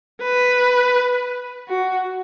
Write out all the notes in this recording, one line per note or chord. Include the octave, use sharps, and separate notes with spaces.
B4
F#4